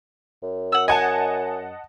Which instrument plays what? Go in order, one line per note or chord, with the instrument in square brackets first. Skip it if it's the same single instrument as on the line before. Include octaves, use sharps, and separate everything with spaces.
[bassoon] F#2
[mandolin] F#5 E6
[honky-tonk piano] D#5 F#5 A5 [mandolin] G#5